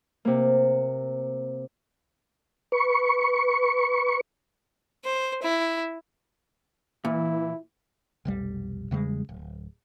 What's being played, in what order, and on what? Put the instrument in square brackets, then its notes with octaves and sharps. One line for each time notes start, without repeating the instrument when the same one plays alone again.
[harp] C3 A#3
[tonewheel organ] B4 C#6
[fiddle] C5
E4
[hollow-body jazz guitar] A#2 [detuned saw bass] E3 [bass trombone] E4
[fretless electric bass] F1 B1 G3
E2 C#3 G3 G#3
D1